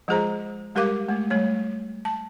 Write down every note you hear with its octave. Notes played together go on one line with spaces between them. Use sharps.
F3 G#3 F4 G#4 C5 A#5
G3 G#3 G4 A#4 F5 D6
G#3 A3
G3 A3 C#5
A5